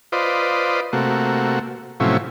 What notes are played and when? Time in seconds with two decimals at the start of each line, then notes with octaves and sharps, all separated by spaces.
0.12 F4 B4 C5 D5 D#5
0.93 C3 A3 A#3 F#4
2.00 A2 C3 F3 F#3 C#4 E4